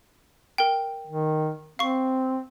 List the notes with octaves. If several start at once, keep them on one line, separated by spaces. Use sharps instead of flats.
A#4 G5
D#3
C4 F5 C#6